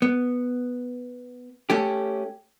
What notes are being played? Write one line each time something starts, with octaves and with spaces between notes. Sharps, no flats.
B3
A3 C#4 G4